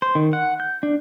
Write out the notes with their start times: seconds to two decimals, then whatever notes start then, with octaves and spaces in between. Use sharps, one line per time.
0.02 C5
0.15 D#3
0.33 F#5
0.60 G6
0.83 D4